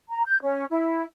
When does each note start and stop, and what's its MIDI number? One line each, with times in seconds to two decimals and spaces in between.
0.09 0.22 82
0.26 0.38 91
0.42 0.65 61
0.70 1.04 64